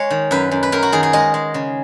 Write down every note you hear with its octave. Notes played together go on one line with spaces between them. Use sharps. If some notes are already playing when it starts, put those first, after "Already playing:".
Already playing: G#3 C#5
D#3
F#2 B4
F#2
B4
F#2 A#4
F#4
D#3 G#4
G#4
G#3 D#5
G#3
C#3